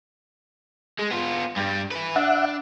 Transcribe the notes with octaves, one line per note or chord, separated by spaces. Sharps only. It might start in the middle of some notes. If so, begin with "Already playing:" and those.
G#3
B3 F4
G2 G3
E4 B4
D4 E5 F#5